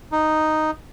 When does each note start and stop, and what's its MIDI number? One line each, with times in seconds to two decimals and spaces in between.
0.12 0.71 63